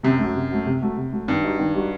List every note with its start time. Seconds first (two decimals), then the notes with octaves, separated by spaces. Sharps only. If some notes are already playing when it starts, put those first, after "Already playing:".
0.03 F#2 C3
0.19 F#3 A3
0.35 C3
0.51 F#3 A3
0.66 C3
0.82 F#3 A3
0.97 C3
1.12 F#3 A3
1.28 G2 D#3
1.43 G3 D#4 F#4
1.59 D#3
1.74 G3 D#4 F#4